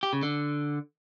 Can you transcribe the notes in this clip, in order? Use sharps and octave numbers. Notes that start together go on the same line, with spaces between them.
G4
C#3
D3